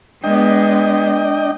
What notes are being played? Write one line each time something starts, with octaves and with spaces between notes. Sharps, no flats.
G#3 B3 D4 D#5 G5